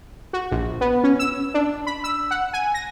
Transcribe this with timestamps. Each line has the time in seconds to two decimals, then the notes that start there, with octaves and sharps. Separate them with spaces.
0.33 F#4
0.51 A#1
0.81 B3
1.04 C#4
1.19 E6
1.54 D4
1.87 B5
2.04 E6
2.31 F#5
2.53 G#5
2.74 A#6